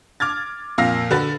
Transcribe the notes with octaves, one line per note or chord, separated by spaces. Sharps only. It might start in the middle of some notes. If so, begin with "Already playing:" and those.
D6 F6 G#6 A6
F2 A#2 F5 E6 F6 A#6
D3 F#4 B4 A6